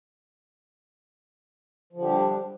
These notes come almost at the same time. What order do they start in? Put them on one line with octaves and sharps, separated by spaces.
F3 D3 G4 G3 D4